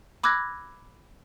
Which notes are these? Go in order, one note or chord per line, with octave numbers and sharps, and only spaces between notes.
B5 D6 E6 F#6 G#6 A#6